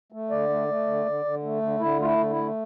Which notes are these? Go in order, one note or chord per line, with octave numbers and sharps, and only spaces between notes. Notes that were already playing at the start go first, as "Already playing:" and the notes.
A3
D3 D5
A3
A3
D3
D3
D3
A3
D3
D3 E4
A3 F4
E4
D3
E4
A3